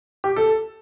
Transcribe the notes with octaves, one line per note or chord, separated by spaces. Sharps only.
G4
A4